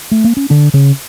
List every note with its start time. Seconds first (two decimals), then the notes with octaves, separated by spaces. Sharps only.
0.11 A3
0.24 A#3
0.37 C#4
0.50 D3 D4
0.74 C#3 C#4